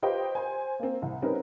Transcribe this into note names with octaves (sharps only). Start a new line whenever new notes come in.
F4 G4 B4 C5 D#5 G5
C5 G#5
A#3 C4
C2
G3 C4 C#4 D#4 A#4 B4